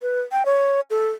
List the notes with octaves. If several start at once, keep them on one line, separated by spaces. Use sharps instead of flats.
B4
G5
C#5
A4